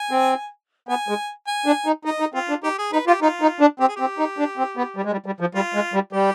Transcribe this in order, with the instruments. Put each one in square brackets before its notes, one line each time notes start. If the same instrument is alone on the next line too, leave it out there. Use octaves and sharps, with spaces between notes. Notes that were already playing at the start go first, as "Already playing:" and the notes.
Already playing: [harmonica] G#5
[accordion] C4
[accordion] B3 [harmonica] G#5
[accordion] G#3
[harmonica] G#5
[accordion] D4
D#4
[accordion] D#4 [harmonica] D#5
[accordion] D#4
[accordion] C4 [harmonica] F4
[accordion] D4
[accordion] D#4 [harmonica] G4
[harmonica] G#4
[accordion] D#4 [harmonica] B4
[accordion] F4 [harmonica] G4
[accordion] D#4 [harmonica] F4
[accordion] D#4
D4
[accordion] C4 [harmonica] G4
[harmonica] G#4
[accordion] C4 [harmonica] G4
[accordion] D#4
D4
C4
B3
G3
G#3
G3
G3
F3
[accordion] G3 [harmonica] F4
[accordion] G#3
G3
[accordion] G3 [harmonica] G4